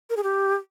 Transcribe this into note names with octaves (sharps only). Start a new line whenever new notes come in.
A#4
G#4
G4